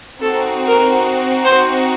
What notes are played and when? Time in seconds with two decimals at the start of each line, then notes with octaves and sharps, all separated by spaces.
0.21 C4 D#4 F#4 A4
0.67 A#4
1.45 C5